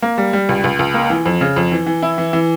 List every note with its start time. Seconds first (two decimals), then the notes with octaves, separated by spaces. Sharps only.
0.02 A#3
0.18 G3
0.33 G3
0.49 C#2
0.64 C#2
0.79 C#2
0.94 A#3
1.10 E3
1.26 F2
1.41 C#3
1.56 F2
1.72 E3
1.86 E3
2.03 E4
2.18 E3
2.33 E3